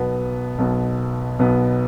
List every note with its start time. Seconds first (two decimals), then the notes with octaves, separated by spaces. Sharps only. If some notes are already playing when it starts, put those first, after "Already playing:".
Already playing: B1 B2 B3
0.58 B1 B2 B3
1.39 B1 B2 B3